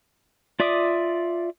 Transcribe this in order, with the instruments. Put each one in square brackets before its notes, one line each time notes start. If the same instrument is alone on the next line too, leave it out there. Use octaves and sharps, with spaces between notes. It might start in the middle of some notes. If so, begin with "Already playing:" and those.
[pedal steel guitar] F4 D5 E5 D6 D#6